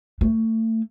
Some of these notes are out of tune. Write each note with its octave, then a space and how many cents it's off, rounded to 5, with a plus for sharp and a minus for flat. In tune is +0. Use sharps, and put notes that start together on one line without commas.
A3 +30